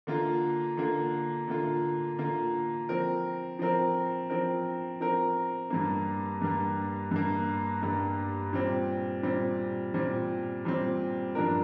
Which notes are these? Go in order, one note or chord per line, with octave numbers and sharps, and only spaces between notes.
D3 A#3 F4
D3 A#3 F4
D3 A#3 F4
D3 A#3 F4
F3 C4 A#4
F3 C4 A#4
F3 C4 A#4
F3 C4 A#4
G2 G3 A#3
G2 G3 A#3
G2 G3 A#3
G2 G3 A#3
A#2 G3 C4
A#2 G3 C4
A#2 G3 C4
A#2 G3 C4
G2 F3 D4 A#4